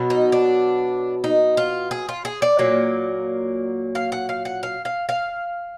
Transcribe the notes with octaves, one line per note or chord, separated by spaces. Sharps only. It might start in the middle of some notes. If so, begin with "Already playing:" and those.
Already playing: B2 F#3 B3
D#4
D4
D#4
F4
G#4
F4
G#4
D5
A#2 F#3 A#3
F5
F#5
F5
F#5
F5
F5
F5